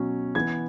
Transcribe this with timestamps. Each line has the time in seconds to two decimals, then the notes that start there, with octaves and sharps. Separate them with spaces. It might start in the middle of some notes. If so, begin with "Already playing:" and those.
Already playing: B2 F#3 C#4
0.35 E3 B3 G#6